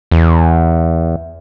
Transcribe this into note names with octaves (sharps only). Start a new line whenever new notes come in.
E2